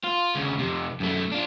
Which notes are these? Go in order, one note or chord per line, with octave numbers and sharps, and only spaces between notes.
F4
D2 C#3
F2 C3
F#2 A3
D4 F4